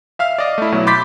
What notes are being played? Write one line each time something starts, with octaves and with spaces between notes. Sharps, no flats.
E5 F5 F6
D5 D#5
A3 E4
B2 F#3 E4
B5 C6 D6 G6 A6 B6